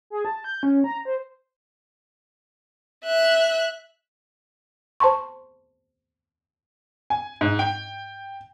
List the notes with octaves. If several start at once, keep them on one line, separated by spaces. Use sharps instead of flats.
G#4
A5
G6
C#4
A#5
C5
E5 F#6
C5 A5 C6 C#6
G#5
G#2
G5